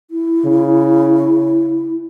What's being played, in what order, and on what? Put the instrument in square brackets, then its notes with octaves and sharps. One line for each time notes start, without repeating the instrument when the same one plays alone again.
[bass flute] E4
[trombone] C#3